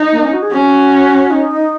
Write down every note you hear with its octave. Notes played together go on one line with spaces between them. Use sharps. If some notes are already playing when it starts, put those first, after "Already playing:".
Already playing: D#4
A#3
C#4
F#4
G#4
C#4 F#4
D#4